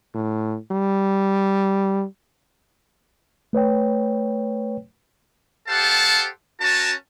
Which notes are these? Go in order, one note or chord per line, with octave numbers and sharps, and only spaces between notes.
A2
G3
A3 B4 C#5 G5
G4 A4 C5 F5 F#5 A5
C#4 F#4 A#4 A5